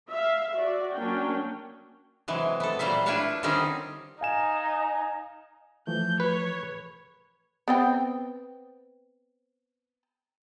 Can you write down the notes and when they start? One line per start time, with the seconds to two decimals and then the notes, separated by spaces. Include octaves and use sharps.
0.11 E5 F5
0.54 F#4 D5
0.94 F#3 A#3 C#4 D4 G5
2.28 C3 E3 F#3 G#3
2.60 B3 A4
2.79 A#2 F#3 G3 C5 E5
3.06 D4 E4 F4 B4 C#5 F5
3.43 D3 D#3 G3 C4 C#4 D#4
4.21 D#4 F5 G#5 E7
5.87 E3 F3 A3 G6
6.20 B4 C#5
7.68 B3 C4 G5